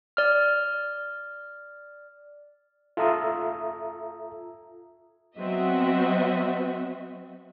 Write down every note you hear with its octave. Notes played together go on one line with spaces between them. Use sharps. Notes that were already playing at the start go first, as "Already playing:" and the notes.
D5 F6
F4 A4 E5 A#5 D#6
F#3 B3 C4 F#4 D#5 E5